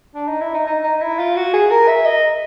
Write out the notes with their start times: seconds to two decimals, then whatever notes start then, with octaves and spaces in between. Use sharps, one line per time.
0.14 D4
0.28 D#4
0.41 E4
0.54 D#4
0.67 D#4
0.84 D#4
1.01 E4
1.19 F4
1.36 F#4
1.54 G#4
1.71 A#4
1.88 E5
2.05 D#5